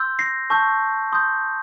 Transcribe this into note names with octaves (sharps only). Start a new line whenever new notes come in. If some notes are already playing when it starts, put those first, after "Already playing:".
Already playing: C6 E6 G6
A#6 C7
A5 C#6 E6 G6
C6 D#6 G6